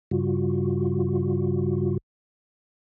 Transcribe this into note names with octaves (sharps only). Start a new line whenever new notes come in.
G2 C#3 G3 F4 F#4